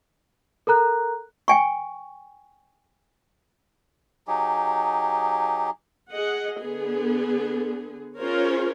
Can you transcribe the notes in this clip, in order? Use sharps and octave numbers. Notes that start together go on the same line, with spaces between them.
A4 A#4 A#5 F#6
G5 G#5 C#6
F#3 D#4 G4 G#4
G#4 D#5 F#5
D3 B3 G#4
C#4 F4 G#4 A#4 C5 C#5